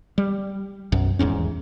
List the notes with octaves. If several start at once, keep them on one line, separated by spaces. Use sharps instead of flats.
G3
B1 F#2
D#1 E2 G#2 C#4